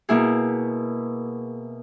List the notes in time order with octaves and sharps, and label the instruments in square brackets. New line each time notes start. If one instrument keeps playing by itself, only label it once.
[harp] B2 A#3 E4 G#4